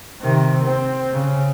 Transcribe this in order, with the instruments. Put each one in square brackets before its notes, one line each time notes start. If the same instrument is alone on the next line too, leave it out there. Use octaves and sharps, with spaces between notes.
[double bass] C3 D#3
C4
C#3